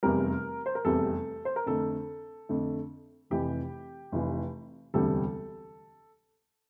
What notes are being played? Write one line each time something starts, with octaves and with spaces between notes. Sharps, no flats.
F1 E2 C3 G3 A#4
C5
A#4
F1 E2 C3 G3 A4
C5
A#4
F2 D3 A3 A4
F2 D3 A3
F1 F2 C3 E3 G4
F1 F2 C3 E3
E1 D2 C3 G3 A4